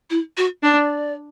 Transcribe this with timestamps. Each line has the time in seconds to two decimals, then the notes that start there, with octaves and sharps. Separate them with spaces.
0.10 E4
0.37 F#4
0.63 D4 D5